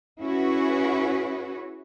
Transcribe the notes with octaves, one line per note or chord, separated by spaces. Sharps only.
C#4 E4 F#4 G#4 B4 C#5